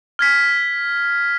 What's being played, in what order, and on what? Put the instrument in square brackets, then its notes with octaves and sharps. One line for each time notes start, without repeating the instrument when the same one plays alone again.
[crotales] F6 G#6 B6